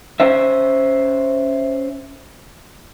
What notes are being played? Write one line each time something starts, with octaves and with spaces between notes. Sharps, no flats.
C#4 C5 E5